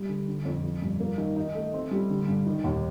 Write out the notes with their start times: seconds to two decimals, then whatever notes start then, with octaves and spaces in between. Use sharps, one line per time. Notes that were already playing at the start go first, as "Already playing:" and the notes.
Already playing: G3
0.09 D3
0.28 D3
0.45 F2
0.64 F3
0.82 G2
1.00 A#3
1.18 D#3
1.36 D#4
1.54 A3
1.73 C4
1.91 G3
2.10 D3
2.28 G2
2.46 D#3
2.64 D#2